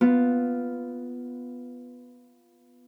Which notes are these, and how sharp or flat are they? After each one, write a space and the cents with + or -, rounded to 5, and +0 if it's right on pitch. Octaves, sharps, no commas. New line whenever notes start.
B3 +0 F4 +0